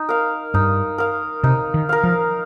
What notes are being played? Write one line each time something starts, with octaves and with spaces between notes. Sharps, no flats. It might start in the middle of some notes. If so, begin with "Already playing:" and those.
Already playing: D#4
A#4 F5
G2 D#4
A#4 F5
C3 D#4
D#3
A#4 F5
F3